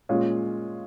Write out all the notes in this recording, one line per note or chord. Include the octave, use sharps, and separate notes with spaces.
A#2 G#3 C#4 F4